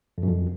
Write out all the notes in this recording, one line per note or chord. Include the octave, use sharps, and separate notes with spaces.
F2
F#2
F2